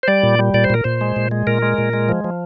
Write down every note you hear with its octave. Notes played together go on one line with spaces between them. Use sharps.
C5
G3 D5
A#2
G3
A#2 D5
C5
A#2 A#4
A#2 C5
G#3
A#2
G#3
A#2 A#4
G#3
A#2
G#3
F3
F3